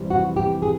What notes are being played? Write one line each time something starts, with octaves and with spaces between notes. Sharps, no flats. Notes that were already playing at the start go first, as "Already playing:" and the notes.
Already playing: F2 C3 E3 G3
F#4
G4
G#4